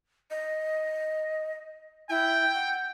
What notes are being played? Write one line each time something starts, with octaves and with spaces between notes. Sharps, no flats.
D#5
E4 G5
F#5